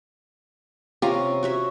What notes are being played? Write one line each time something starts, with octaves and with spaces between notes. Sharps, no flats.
C3 C#4 F4 G4 A#5
F#4 C#5 E5